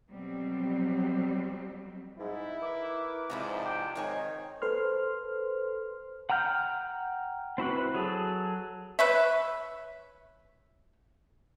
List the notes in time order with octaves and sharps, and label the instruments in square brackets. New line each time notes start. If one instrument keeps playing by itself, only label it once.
[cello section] F2 B2 F#3 G3 C4
[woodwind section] G#2 [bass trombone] E4
[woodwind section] E3 D6 [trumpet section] A#4 B4
[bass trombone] G#2 [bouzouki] C3 F3 D4 [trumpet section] E4
[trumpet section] G5 D6
[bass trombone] G#2 [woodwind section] D#3 [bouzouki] C4 C#5 G#5 [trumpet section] D#4
[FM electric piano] A4 B4 C5 C6 F6
[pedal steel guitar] F#5 G5 A#5 F6 G6
C4 E4 F#4 B4
F#3 G#4 A4
[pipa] B4 C#5 E5